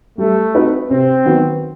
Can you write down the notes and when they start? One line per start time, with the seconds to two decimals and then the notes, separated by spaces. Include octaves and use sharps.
0.18 G3 A3
0.54 C4 D#4 F#4 B4
0.90 C3 C4
1.25 D#3 F#3 B3 F#4